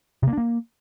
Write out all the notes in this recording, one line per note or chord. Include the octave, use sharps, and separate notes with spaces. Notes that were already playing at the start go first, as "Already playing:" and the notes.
C3
A#3
D4
A#3